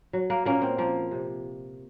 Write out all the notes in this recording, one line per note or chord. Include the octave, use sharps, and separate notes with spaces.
F#3
A#3
A#2 A#3 C#4
C4
F3 A#3
C3